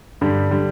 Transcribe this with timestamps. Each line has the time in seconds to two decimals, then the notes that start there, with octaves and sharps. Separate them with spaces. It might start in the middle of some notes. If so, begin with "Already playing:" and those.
0.21 G2 D3 G3
0.51 D3 G3